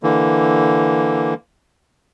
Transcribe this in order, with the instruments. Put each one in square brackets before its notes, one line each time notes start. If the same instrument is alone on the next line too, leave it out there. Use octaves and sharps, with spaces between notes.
[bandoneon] D3 E3 A#3